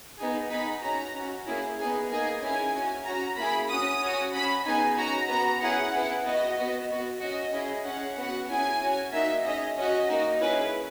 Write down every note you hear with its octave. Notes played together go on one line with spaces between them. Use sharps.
B3 D#4 G#4
B3 D#4 G#4 B5
C#4 F#4 A#5
C#4 F#4
A#3 C#4 E4 G#4
B3 D#4 G#4
A#3 D#4 G#4 G#5
C#4 E4 G#4 G#5
C#4 F#4
C#4 F#4 A#5
A#3 E4 G#4 B5
C#4 F#4 D#6
C#4 F#4
C#4 F#4 B5
B3 D#4 G#4 G#5
C#4 F#4 A#5
B3 F#4 A#5
C#4 E4 G#4 F#5
B3 E4 G#4
B3 F#4 D#5
B3 F#4
B3 F#4
C#4 F#4 D#5
C#4 E4 G#4
C#4 G#4 F#5
B3 F#4 F#5
C#4 E4 G#4 G#5
C#4 F#4
A#3 D#4 F#4 E5
C#4 G#4 D#5
C#4 F#4 D#5
A#3 D#4 F#4
C#4 E4 G#4 B4